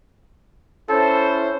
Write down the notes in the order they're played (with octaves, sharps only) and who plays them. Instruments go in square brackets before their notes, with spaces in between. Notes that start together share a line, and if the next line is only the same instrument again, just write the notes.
[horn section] C#4 E4 C5 [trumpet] A4